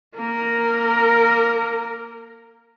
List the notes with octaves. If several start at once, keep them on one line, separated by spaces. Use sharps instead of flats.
A#3 A#4